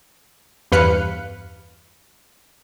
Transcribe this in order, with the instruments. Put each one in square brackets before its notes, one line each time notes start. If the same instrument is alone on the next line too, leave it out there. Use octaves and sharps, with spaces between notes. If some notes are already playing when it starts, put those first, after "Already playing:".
[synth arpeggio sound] E2 G2 B4 F5 F#6 C#7